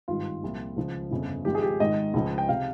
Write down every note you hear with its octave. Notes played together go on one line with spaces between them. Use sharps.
G#1 G2 D#3 F4
C2 A#2 F3
C#2 C#3 F3
G1 F2 C#3 F3
G#1 G#2 F3 G4
G#4
G4
G#1 G#2 D#3 D#5
C#2 C#3 F3
G5
C3 F5